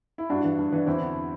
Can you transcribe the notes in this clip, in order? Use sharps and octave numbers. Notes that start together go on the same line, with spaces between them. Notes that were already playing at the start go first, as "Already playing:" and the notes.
E4
G2 D4 F#4
E3
G2
E3 D4
E2 C4 E4
D3